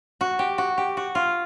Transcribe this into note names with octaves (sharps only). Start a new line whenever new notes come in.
F#4
G4
F#4
G4
F#4
F4